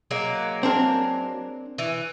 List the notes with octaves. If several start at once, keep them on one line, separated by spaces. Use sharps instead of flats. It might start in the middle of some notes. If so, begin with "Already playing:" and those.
F#3 G#3 A#3
C4 D4 A#4
E3